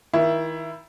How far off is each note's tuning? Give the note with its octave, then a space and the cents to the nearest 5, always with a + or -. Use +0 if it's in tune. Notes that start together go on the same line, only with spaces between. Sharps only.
D#3 +35 E4 +15